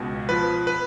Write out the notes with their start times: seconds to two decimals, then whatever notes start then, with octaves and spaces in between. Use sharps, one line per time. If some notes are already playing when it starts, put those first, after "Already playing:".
Already playing: C#2 B2
0.29 F3 B4
0.67 B4